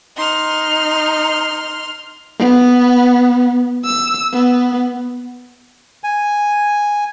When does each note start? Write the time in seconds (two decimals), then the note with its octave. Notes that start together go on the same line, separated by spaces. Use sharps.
0.17 D#4 C6 F6
2.39 B3
3.85 E6
4.33 B3
6.04 G#5